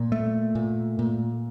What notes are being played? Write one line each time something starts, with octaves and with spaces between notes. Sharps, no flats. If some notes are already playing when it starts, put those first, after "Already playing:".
Already playing: A#2
A3
A#2
A#2